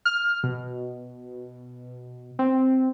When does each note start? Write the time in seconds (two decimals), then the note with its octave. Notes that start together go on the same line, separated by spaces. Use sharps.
0.05 F6
0.44 B2
2.39 C4